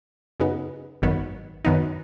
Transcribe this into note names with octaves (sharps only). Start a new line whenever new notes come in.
F#2 C#3 B3 D#4
G#1 F#2 D#3 F#3 B3
F#2 D#3 B3 D#4